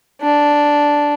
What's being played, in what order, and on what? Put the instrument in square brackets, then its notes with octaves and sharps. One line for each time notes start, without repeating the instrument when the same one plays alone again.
[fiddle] D4